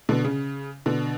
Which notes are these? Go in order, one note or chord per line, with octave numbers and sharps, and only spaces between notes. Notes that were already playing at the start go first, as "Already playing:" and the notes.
B2 D3
C#3
B2 D3